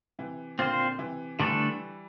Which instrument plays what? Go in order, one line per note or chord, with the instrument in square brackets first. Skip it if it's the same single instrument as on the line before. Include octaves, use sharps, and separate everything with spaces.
[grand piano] C3 E3
[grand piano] A#2 D3 [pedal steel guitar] C4 F4 C5
[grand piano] C3 E3
[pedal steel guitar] D3 A3 D4 A4 [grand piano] E3 G3